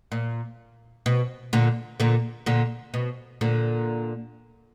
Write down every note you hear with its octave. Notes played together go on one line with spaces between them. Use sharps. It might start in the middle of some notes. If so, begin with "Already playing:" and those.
A#2
B2
A#2 D3
A#2 D3
A#2 D3
B2
A#2 D3